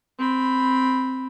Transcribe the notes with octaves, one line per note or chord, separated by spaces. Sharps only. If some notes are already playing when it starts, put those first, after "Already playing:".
C4 B5